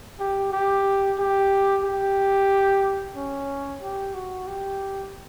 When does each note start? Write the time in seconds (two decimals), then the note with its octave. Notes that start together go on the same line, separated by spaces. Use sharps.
0.20 G4
0.52 G4
1.19 G4
1.84 G4
3.16 C#4
3.82 G4
4.14 F#4
4.47 G4